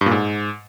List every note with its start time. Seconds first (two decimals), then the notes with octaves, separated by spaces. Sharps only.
0.01 G2
0.06 A#2
0.11 G#2